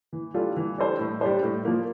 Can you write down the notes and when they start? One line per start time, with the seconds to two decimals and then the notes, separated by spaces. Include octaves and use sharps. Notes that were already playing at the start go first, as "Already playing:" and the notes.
0.13 E3
0.34 G3 D4 F4 A4
0.56 E3
0.78 G3 D4 A4 C5
0.99 A2
1.21 G3 D4 G4 C5
1.43 A2
1.65 F3 A#3